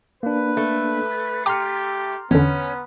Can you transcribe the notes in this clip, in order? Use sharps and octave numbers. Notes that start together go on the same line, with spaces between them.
A#3 D4 B4
A3
G4 G5 A#5 C6 D6 F6
E2 D3 B3 C#4